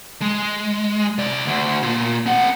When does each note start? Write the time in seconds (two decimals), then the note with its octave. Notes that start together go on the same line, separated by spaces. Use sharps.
0.22 G#3
1.18 C3 D5
1.47 D2
1.83 A#2
2.26 C4 F#5